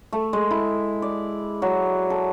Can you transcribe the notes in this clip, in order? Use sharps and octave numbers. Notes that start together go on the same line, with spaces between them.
A3
G#3
E4
D5
F#3
A4